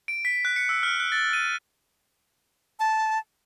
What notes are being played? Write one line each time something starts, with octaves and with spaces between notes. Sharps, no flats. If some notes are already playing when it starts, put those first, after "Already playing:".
D7
B6
F#6
C#7
E6
F6
F#6
A6
D#7
A5